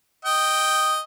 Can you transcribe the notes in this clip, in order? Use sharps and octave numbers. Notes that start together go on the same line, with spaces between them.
D#5 G5